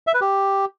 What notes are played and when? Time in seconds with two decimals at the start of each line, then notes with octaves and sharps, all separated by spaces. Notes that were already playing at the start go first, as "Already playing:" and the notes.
0.07 E5
0.14 B4
0.21 G4